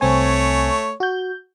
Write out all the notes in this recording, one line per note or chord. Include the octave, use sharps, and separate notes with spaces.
C2 A3 C4 C#5 G#5
F#4 G6